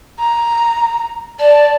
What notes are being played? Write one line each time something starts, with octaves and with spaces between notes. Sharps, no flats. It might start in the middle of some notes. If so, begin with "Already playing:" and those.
A#5
D5 A5